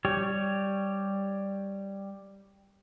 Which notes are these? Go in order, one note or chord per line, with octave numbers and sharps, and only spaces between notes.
G3 G4 C#5